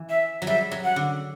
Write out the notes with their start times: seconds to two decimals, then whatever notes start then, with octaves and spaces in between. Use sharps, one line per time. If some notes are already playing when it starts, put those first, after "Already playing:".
Already playing: E3
0.09 E5
0.42 F#3
0.47 G3 E5
0.71 F#3
0.84 F#5
0.96 D3